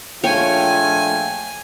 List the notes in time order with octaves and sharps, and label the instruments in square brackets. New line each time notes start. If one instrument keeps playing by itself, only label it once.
[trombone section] A#1 A3 F4 [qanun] C#5 [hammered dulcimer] G5 [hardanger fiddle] G#5